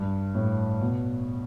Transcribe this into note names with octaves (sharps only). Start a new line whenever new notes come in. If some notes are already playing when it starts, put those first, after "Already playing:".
Already playing: G2
A2
B2